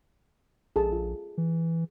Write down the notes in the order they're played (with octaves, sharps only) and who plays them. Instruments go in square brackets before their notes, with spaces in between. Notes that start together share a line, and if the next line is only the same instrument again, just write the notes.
[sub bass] A#1 [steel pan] G#4 A4 A5
[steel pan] F4
[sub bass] E3